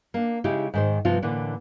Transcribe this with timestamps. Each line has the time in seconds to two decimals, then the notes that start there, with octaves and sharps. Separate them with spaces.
0.14 A#3 D4
0.44 C#3 G#3 D#4 E4 G4
0.74 G#2 D#3 C5
1.05 G2 C3 F3 B3 C4 F4
1.22 A2 D3 E3 A#3 D4